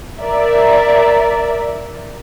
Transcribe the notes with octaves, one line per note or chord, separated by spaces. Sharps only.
A#4 D5 E5